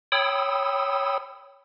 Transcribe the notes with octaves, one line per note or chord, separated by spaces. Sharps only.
C#5 G5 B5 D#6 E6